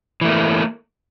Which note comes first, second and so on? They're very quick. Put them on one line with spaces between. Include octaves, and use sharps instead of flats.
E3 A3 A#3